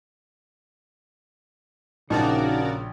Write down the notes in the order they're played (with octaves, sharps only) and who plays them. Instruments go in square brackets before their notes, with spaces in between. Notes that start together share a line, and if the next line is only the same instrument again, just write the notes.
[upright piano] A#1 [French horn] C#3 [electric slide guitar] D#4 A5 [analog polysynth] F#4 A#4 D5